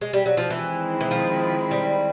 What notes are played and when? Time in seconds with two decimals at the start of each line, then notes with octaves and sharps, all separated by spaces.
0.01 G#3
0.13 G3
0.26 F#3
0.37 F3
0.50 D#3 E3 G#3 C4 E4
1.01 E3
1.11 F3
1.71 G3